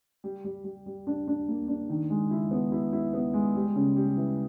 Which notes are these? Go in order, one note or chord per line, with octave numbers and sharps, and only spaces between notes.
G3
G3
G3
G3
D4
D4
A#3
D4
D#3
G#3
E4
B3
E4
E4
B3
G#3
G3
C#3
G3
E3